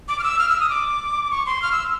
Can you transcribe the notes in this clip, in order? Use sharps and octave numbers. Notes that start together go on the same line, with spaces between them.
D6
F6
E6
F6
E6
D#6
D6
C#6
C6
F6
E6